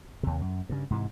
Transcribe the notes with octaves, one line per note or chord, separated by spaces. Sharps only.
D#2 C3
F#2
G2 C#3
G#2 C3 E3